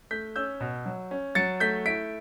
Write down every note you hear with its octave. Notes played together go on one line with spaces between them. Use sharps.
A3 G6 B6
C#4 E6 G6
B2
F#3
C#4
F#3 A6 C#7
A3 G6 B6
E4 B6 D7